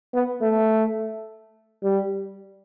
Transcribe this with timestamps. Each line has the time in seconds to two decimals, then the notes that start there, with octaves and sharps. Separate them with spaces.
0.14 B3
0.42 A3
1.83 G3